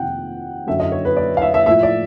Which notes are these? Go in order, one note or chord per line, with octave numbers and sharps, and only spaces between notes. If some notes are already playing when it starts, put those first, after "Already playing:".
Already playing: F2 C3 D#3 F#5 G5
F#2 D3 F#3 E5
D#5
C#5
B4
D5
F5
E5
E5
A2 F3 E5
D5